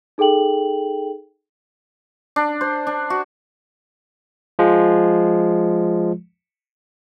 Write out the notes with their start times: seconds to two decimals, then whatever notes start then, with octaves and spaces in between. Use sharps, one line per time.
0.18 D#4 G#4 A4 G5 F#7
2.36 D4
2.61 C5
2.87 D4
3.10 F#4
4.59 F3 G#3